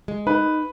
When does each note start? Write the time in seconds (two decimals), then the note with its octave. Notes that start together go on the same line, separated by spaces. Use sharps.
0.08 G#3
0.27 D#4 B4